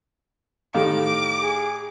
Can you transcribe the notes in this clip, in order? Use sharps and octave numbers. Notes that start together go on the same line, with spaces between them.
A2 D#3 G4 A4 F5 D6
G#4